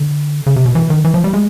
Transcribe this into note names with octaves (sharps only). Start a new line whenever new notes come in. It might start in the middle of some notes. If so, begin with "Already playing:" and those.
Already playing: D3
C#3
C3
B2
E3
D#3
E3
F3
G3
G#3